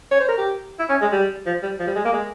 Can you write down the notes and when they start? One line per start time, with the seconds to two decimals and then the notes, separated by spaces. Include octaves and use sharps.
0.11 C#5
0.20 C5
0.28 A#4
0.37 G4
0.79 E4
0.89 C#4
1.01 G#3
1.12 G3
1.46 F3
1.63 G3
1.80 F3
1.87 G3
1.96 G#3
2.05 A#3
2.13 G#3